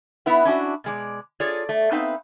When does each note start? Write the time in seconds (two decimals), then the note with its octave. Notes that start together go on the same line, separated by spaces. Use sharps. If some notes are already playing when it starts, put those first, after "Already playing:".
0.26 B3 D#4 E4 B4 F#5
0.45 C#4 D4 E4 F#4
0.84 B2 G#3 D5
1.40 F4 G#4 A4 C#5 D5
1.69 A3
1.91 B3 C4 D#4 B4 E5 F5